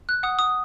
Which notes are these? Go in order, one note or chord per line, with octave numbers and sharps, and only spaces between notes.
F#6
F#5 D#6
D#6